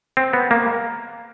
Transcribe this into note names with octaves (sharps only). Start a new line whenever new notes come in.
C4
B3
A#3